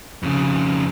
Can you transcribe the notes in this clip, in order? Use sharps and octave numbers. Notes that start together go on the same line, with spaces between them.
F2 C#3